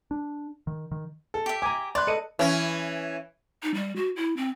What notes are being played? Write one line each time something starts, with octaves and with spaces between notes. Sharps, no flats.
D4
D#3
D#3
A4
G4 E5
G#5 A#5 D6
B4 D5 C6 F#6
A4 D#5 C#7 D#7
E3 C#4
D#4
G3
F#4
E4
C4